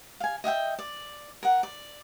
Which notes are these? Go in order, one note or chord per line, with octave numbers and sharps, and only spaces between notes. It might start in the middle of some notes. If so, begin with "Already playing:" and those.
F5 G#5
D#5 E5 F#5 G5
D5
A#4 F#5
D5